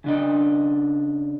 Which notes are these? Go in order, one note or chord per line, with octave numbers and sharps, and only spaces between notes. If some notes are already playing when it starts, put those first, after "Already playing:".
C#3 D4 D#5